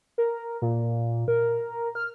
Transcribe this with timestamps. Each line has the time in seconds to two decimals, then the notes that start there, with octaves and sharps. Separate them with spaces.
0.18 A#4
0.62 A#2
1.28 A#4
1.95 F6